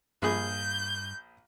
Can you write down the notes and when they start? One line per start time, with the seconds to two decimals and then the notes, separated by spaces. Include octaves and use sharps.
0.22 A#1 G2 G#4 G6